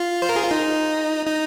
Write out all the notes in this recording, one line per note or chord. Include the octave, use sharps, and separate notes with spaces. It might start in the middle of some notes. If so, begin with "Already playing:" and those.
Already playing: F4
C5
A#4
G#4
F4
D#4
D#4